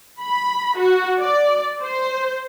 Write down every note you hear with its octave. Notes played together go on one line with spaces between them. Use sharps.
B5
F#4
D5
C5